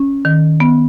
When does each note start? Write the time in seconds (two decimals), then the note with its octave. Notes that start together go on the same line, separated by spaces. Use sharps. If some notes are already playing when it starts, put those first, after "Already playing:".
Already playing: C#4
0.25 D#3
0.60 B3